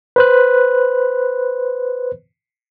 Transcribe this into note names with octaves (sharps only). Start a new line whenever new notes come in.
B4 C5 F#6